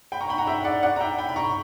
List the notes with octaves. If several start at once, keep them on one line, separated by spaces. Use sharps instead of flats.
G5 B5
A#5 C#6
G5 B5
F#5 A#5
E5 G5
D5 F#5
D5 F#5
A#5
E5 G5
G5 B5
B5
A#5 C#6